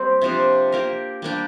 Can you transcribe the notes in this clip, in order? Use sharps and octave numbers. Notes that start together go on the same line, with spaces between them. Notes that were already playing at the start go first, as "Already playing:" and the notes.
Already playing: G3 A#3 C4 G4
C3 F3 D4
A#3 G4 A#4
G3 A#3 D4 G4